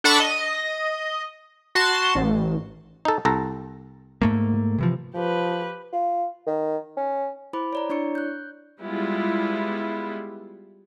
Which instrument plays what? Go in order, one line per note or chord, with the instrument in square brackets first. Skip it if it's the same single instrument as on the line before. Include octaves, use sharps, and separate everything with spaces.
[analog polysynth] D4 A4 F#5 A5 B5 C#6
D#5
F#4 A5 C6
A1
[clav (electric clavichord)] D#4 A4
C2 A4 A#5
[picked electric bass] G#2 A3 A#3
C3 E3 F3
[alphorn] F3 [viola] G4 B4
[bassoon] F4
D#3
C#4
[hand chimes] E4 C5 B5 D6
C#5 D5 A#5
D4 E4 C#5 D5 C#6 C#7
F#6 G6
[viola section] G3 G#3 B3 E4 F4